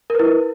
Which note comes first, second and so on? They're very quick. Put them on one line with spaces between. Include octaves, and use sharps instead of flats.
A#4 B4 E4